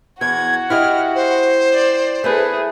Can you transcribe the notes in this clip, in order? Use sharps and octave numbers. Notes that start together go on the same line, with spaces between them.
E2 F#4 G#6
E4 G4 D#5 F6
C5
D5
A3 E4 G#4 A4 B4